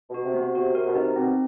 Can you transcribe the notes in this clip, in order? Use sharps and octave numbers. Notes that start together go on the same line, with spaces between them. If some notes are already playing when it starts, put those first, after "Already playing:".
B2
F#4
C3
B3
C3
C3 F#4
C3 A#4
B2
C3 D#4
B2 C4